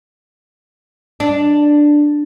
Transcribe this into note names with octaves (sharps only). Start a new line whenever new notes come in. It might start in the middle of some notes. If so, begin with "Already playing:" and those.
D4